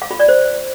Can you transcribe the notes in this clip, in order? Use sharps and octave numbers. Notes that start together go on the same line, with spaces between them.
F5
F4
D5
C5